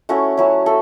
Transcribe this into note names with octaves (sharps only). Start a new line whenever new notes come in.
A3 C#4 E4 F#4
F#3 C#4 E4
A3 A4